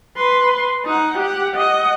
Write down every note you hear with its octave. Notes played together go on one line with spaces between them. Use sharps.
B4 C6
D#4 F#5
G4 F#5
D#5 F#5